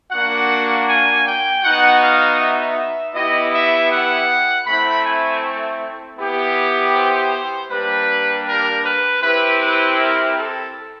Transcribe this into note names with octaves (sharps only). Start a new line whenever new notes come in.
A#3 D4 F#4 F#5
G#5
G5
B3 D#4 F#4 F#5
F5
E5
B3 E4 G4 D#5
E5
F#5
A3 C4 E4 B5
G#5
B3 E4 G4
C5
G3 A#3 D4 G4 B4
A#4
B4
C4 E4 G4 B4
B4
A#4
A4